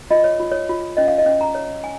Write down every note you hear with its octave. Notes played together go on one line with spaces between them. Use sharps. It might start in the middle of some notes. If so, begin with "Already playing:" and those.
F4 D#5
C#5
F4
C#5
F4
C#4 D#5
F5
D#5
C#4
A#5
C#5
G#5